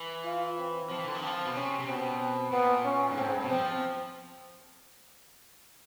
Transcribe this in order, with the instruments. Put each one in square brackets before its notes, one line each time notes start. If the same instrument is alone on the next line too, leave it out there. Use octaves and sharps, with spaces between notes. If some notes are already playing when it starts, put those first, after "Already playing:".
Already playing: [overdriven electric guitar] E3
[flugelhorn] F4
C4
[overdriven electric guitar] F3 [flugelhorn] C4
[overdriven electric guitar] E3
D3
D#3
F3
B2
[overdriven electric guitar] C3 [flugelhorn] C#4
[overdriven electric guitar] C3
[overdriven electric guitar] B2 [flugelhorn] C4
[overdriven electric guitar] A#2 [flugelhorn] B3
[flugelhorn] C#4
[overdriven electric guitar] G#2
[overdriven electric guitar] A2 [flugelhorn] C4
[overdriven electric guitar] G#2
G2
B2
[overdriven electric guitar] F3 [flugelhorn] C4